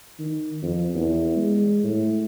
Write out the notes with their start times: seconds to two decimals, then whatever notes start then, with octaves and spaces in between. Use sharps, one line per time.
0.19 D#3
0.62 F2
0.94 E2
1.36 G#3
1.83 A2